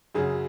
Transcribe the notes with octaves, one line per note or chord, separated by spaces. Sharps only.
F#2 C#3 F#3 G#4